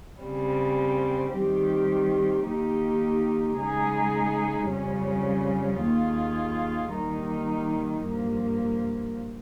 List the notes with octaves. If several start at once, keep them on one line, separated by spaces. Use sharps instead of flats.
C#3 G3 C4
D#3 G3 C4 G4
D#3 A#3 D#4 G4
C#3 G#3 D#4 G#4
F2 C#3 G3 C#4
D#2 D#3 A#3 F4 G#4
D#3 G3 A#3 D#4
G2 F3 A#3